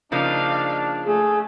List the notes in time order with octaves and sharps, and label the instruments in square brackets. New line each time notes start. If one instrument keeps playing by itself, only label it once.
[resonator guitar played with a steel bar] C#3 F3 A#3 [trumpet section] D4 [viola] D#4 F5
[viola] A3 [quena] G#4